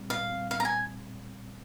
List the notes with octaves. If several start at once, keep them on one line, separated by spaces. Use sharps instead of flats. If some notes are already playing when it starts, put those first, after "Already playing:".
Already playing: A#2 G3 C4
A#2 F5
G3 C4
A#2 F5
A#5
G#5